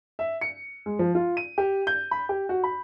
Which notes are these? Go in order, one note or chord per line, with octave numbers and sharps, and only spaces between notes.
E5
C#7
G#3
F3
F4
D#7
G4
G6
B5
G4
F#4
B5